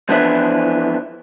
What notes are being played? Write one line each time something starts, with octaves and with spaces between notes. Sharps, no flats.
F2 E3 F3 B3 D4 E4